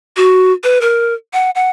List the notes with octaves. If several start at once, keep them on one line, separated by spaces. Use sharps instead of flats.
F#4
B4
A#4
F#5
F#5